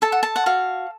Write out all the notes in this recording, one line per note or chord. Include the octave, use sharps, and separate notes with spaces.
A4 A5
F#5
A5
F#5
F#4 F5